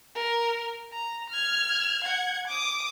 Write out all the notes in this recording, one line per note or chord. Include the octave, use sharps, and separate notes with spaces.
A#4
A#5
F6 G#6
F#5 G#6
D6 D#6